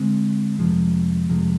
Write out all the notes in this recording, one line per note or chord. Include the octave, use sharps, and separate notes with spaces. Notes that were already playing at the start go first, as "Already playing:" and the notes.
Already playing: D3 G#3 C4
F2 C3 F3 G#3
F2 C3 F3 G#3